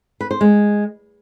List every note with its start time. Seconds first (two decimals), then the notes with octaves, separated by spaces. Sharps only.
0.21 B4
0.31 C5
0.41 G#3